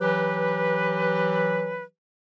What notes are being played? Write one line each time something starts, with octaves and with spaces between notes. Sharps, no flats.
E3 F#3 G4 B4